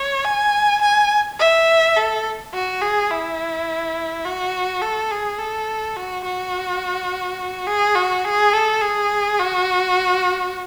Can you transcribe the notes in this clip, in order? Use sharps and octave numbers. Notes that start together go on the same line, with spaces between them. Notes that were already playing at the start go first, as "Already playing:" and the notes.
Already playing: C#5
G#5
G#5
E5
A4
F#4
G#4
E4
F#4
A4
G#4
A4
F#4
F#4
G#4
F#4
G#4
A4
G#4
F#4